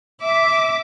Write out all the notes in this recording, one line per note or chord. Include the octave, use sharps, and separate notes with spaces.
E5 D6